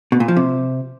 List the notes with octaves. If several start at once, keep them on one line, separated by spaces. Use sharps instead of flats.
B2
A#2
F3
C3